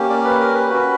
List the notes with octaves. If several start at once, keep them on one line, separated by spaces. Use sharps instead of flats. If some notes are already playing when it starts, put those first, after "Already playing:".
Already playing: A#3 C#4 G4
D5
B4
A#4
B4
C#4 F#4 B4